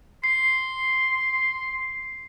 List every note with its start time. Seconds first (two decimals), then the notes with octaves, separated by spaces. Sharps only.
0.24 C6 C7